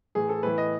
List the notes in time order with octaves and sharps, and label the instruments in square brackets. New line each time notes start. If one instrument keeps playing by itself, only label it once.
[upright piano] A2 E3 G#4
A4
A2 E3 B4
D#5